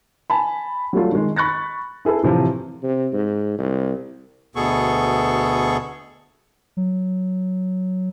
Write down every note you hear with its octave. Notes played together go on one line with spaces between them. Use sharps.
G#5 A5 B5
F#3 G3 A3 F4
D#3 G#3
B5 C#6 F#6 A6 A#6
E4 G#4 A4 B4
A2 C3 E3 F3
C3
G#2
C2
D2 B2 B3 G#4 A4 C#6
F#3